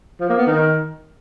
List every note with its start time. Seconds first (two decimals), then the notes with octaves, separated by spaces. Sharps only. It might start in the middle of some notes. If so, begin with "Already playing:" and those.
0.20 F3
0.29 A#3
0.38 B3
0.47 D#3